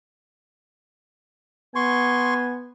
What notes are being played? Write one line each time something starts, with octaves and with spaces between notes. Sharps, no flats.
B3 G#5 C6 C#6